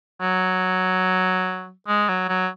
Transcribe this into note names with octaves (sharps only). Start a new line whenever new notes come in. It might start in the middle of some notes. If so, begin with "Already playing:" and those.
F#3
G#3
F#3
F#3